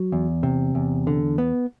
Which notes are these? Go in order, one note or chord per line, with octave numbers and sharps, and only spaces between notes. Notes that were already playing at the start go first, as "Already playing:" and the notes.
Already playing: F#3
E2
C3
E2
D3
B3